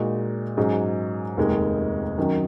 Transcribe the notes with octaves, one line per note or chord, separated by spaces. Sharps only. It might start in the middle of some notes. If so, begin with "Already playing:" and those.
Already playing: A#2 G#3 D#4 F#4
G#2 F#3 C#4 G#4
F1 D#2 D#3 G#3
F#2 D#3 F#3